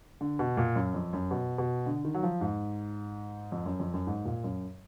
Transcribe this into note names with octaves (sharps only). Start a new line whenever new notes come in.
D3
B2
A#2
F#2
F2
F#2
B2
B2
D3
D#3
F#3
F3
G#2
F2
F#2
F2
F#2
G#2
A#2
F#2